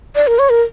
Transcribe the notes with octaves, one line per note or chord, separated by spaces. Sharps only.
D5
A#4
C#5
A#4